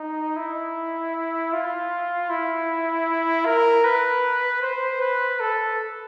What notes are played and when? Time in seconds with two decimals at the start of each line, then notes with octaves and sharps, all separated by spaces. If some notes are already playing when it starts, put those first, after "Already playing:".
Already playing: D#4
0.36 E4
1.53 F4
2.30 E4
3.46 A#4
3.85 B4
4.62 C5
5.01 B4
5.40 A4